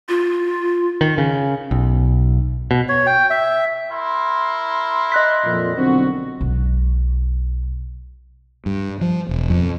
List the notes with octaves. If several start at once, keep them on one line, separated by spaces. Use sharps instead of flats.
F4
D#3
C#3
B1
B2
C#5
G5
E5
E4 A#4 C6
D#5 F#6 B6
F2 A#2
B1 D3 C4 F#4
B1 G#3
G2
F3
E1
F2